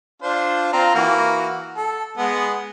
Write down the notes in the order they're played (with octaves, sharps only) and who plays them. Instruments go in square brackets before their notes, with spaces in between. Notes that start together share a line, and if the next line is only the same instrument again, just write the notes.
[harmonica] D4 F4 C5
C4 F4 A#5
E3 A#3 F#4
A4
G#3 B3